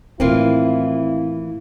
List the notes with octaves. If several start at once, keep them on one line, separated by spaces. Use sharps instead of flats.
A2 D#3 E3 A#3 C4 E4 F4